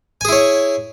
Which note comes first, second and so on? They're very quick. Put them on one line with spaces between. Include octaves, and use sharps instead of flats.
G#5 G#4 E4 C#5